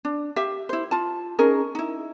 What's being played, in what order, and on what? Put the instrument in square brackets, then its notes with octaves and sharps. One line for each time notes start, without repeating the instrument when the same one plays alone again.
[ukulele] D4
G4 E5 F5
E4 C5
F4 A5
C#4 D#4 G#4 A#4
D#4 E4